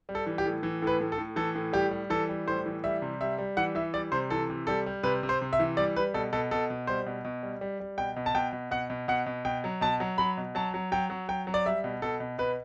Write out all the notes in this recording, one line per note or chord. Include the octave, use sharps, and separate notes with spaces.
G3
A4
E3
G4
A2
E3
A2 B4
A2
A4
A2
E3 A4
A2
G3 G4
G3
E3 A4
G3
A2 C5
E3
G3 E5
C3
G3 E5
G3
E3 F#5
E3 E5
G3 D5
C3 C5
E3 A4
C3
G3 A4
G3
C3 B4
C3
C5
C3
E5
E3
G3 D5
G3 B4
B2 A4
B2 A4
B2 A4
B2
G3 C5
B2
B2
G3
G3
G3
B2 G5
B2
A5
B2 G5
B2
B2 F#5
B2
B2 F#5
B2
B2 G5
F#3
B2 A5
F#3
F#3 B5
B2
F#3 A5
F#3
F#3 G5
F#3
F#3 G5
F#3
D5
G3 E5
B2
B2 A4
B2
B2 B4